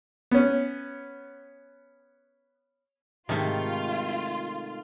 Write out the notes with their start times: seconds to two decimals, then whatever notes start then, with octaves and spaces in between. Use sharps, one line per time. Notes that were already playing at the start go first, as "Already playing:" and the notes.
0.31 B3 C#4
3.29 G#2 C3 D#3 A3 F4